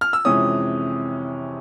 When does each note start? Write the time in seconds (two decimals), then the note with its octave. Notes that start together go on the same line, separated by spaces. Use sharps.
0.01 F6
0.13 E6
0.25 F2 C3 E3 G#3 C#4 D#6